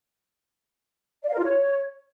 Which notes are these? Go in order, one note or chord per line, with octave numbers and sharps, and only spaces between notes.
D5
F5
A#4
F4
C#5